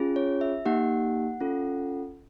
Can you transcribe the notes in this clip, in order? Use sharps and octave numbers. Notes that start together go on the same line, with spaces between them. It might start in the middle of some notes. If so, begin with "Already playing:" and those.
Already playing: C#4 F4 G#4
C#5
E5
A#3 D#4 G4 F#5
C#4 F4 A4